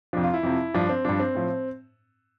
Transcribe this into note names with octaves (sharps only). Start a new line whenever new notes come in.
F2 C3 F3 D4
F4
E4
F2 C3 F3
G2 F3 D4
C4
G2 F3 D4
C4
A2 F3